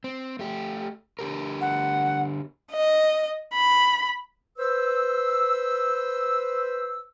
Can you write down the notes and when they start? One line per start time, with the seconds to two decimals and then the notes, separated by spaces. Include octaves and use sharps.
0.04 C4
0.39 A3 G4
1.19 D3 G4 A#4
1.61 F#5
2.72 D#5
3.54 B5
4.59 B4 C5 E6